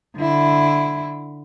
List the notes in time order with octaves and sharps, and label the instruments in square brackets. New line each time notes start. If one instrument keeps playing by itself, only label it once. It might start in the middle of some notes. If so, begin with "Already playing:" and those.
[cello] D3 E4